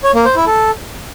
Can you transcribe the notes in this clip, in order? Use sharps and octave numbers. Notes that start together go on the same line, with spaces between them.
C#5
A#3
C5
E4
A4